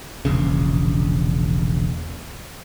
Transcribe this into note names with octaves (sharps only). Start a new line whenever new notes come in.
E1 A#1 C#3